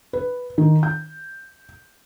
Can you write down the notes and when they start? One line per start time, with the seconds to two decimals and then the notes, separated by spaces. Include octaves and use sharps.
0.13 B4
0.58 D#3
0.83 G6